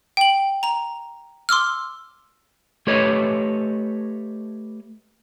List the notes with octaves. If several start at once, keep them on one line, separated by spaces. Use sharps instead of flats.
G5 F#7
A#5 F7
C6 D6 E6 F6
A3 G4 A4 B4 C#5 D#5